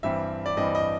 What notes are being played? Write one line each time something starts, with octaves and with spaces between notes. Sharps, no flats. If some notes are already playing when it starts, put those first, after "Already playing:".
G2 E3 G3 C4 E5
D5
G2 E3 G3 C4 D#5
D#5